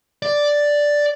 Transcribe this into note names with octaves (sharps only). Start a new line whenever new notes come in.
D5